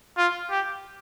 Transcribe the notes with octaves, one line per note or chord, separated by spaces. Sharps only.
F4
G4